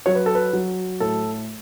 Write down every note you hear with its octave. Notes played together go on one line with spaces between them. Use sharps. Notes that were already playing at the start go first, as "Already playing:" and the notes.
F#3 C#5
B4
A4
B4
F#3
A2 A4